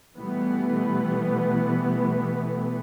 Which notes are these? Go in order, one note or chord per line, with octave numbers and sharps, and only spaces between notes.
B2 E3 G3 A3 B3